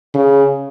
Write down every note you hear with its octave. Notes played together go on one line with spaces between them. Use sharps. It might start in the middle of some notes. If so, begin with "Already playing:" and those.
C#3